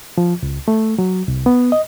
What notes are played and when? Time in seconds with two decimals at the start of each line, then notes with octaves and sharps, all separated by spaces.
0.18 F3
0.43 C#2
0.68 A3
0.98 F#3
1.28 C2
1.46 B3
1.72 D#5